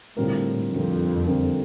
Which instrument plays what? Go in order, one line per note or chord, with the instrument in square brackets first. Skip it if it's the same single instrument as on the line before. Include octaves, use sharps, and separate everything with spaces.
[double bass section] A2 [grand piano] D3 G3 C4 F4 A#4
[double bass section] F2 [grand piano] D3 G3 C4 F4 A#4
[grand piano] D3 G3 C4 F4 A#4